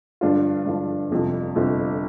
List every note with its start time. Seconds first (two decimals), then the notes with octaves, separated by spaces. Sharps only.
0.21 G2 D3 F3 D4 F4
0.66 G2 D3 F3 D4 F4
1.10 G1 F2 C3 F3
1.55 G1 F2 C3 F3